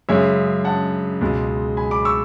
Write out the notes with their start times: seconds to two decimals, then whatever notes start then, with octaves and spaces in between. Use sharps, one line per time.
0.09 F#2 C#3 G#3 C#5 E5
0.65 F#5 A5
1.21 C#2 B2 G#3
1.77 G#5 B5
1.91 B5 D6
2.05 C#6 E6